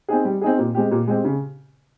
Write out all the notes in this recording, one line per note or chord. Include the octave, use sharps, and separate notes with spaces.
C4 D#4 G#4
G3
C4 D#4 G#4
A#2
G#3 C4 G4
A#2
G#3 C4 G4
C#3